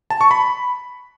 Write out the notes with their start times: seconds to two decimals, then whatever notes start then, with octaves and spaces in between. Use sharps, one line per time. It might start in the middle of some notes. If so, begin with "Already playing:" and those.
0.10 A5
0.21 C#6
0.31 B5